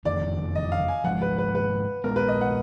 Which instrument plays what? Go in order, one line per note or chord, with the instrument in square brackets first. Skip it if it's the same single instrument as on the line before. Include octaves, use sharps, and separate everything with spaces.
[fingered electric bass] F#1 F2 D#3 [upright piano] D5
[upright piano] D#5
F5
G#5
[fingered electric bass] G#1 G#2 F3 [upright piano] F#5
[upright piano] B4
B4
B4
[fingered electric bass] A#1 A#2 G#3 B3 [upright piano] A#4
[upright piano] B4
D#5
F#5